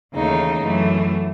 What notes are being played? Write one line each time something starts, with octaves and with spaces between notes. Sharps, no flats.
D#2 C#3 E3 A3 D#4
F#2 E3 A3